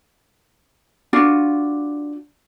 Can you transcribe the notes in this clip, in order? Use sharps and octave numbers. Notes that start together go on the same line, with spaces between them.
D4 F4 F#4